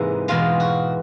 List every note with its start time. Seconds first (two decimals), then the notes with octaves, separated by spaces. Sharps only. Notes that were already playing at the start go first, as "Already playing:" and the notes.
Already playing: G#2 C3 E3 G#3 A#3 E4
0.28 E2 B2 G#3 F4
0.60 F#4